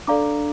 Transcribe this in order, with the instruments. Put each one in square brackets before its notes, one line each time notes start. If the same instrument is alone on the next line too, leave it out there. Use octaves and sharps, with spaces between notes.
[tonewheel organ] D4 [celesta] A4 D5 F5 A#5 D6